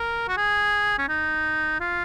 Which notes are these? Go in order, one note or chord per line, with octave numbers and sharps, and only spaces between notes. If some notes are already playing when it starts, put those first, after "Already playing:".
Already playing: A#4
F#4
G#4
C#4
D#4
F4